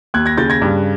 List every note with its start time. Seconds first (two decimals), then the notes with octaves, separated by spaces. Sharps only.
0.14 D#2 F#6 G#6
0.26 G#6 A#6
0.38 C#3 G6 A6
0.50 G#6 A#6
0.62 G2